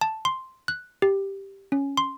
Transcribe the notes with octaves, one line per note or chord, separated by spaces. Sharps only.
A5
C6
F#6
G4
C#4
C6